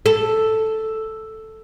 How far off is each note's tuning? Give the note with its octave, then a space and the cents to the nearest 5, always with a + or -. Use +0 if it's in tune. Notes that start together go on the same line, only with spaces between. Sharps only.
A4 +0